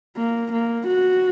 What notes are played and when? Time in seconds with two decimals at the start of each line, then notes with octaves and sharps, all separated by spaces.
0.17 A#3
0.52 A#3
0.87 F#4